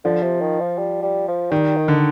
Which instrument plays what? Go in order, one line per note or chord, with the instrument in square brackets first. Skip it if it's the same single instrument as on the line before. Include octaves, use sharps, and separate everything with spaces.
[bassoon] D3 [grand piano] F3
[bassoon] C3
D#3
F3
G3
G3
F3
[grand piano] D#3 [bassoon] G3
[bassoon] D#3
[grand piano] D3